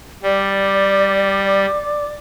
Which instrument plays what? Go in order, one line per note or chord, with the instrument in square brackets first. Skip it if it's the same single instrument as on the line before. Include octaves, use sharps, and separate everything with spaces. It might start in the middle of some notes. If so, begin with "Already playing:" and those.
[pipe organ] G3 [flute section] D5 D6